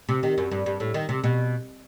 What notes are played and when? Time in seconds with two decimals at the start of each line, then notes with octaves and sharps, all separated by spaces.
0.09 C3
0.23 D#3
0.38 F#2
0.51 G2
0.66 G2
0.80 A2
0.94 D#3
1.09 C3
1.24 B2